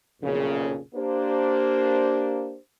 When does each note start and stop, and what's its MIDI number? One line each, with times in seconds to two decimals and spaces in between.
0.22 0.78 35
0.22 0.78 41
0.22 0.78 46
0.22 0.78 49
0.95 2.57 58
0.95 2.57 62
0.95 2.57 67
0.95 2.57 72